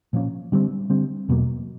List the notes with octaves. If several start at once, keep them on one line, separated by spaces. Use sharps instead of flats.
A#2 F3 A#3 C#4
D3 G3 C4
D3 G3 C4
E2 B2 F#3 A#3